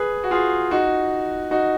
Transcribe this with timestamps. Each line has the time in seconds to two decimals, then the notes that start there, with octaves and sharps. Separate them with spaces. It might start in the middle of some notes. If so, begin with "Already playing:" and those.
Already playing: G#4 B4
0.24 F#4
0.31 F4 G#4
0.71 D#4 F#4
1.51 D#4 F#4